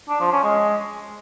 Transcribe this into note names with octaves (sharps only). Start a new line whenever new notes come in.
D4
F3
C#4
G#3